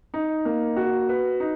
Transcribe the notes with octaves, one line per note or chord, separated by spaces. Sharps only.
D#4
A#3
F#4
B4
D#4